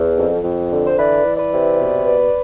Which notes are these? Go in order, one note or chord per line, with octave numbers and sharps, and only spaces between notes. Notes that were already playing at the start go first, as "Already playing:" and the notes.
Already playing: E2
F2
F2
D3
C5
E3 B4 D5
E3
B4 D5
C3
B2
B2